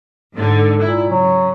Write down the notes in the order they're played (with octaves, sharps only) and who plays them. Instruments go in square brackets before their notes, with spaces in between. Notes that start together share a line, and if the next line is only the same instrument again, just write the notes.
[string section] G#2 D3
[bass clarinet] A#2 [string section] E4
[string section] C#3 [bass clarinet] F#3